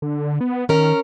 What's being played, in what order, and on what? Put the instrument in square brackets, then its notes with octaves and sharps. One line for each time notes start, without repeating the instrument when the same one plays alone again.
[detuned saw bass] D3
B3
[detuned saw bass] D#3 [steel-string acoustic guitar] C#4 A#4